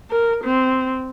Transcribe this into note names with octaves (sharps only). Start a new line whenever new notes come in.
A#4
C4